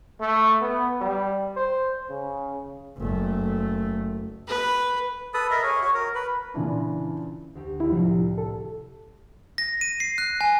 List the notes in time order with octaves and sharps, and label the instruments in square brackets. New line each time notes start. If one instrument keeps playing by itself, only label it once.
[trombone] A3
B3
G3
C5
C#3
[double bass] F#1 A3
[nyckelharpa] B4
[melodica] A4 B4 D#6
A#4 D#5 E5
G#4 C#5
F#4 C#5
A#4
B4
[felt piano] A#2 C#3 E3 D4
[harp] D2 G4
[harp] D#2 A#3 [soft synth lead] E4
[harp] C2 A2 [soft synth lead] F3
[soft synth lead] A4
[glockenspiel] A#6
D#7
C7
F#6
G#5